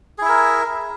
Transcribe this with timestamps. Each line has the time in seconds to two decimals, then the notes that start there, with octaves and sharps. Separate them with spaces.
0.18 G#4
0.22 E4
0.25 E5
0.29 A#4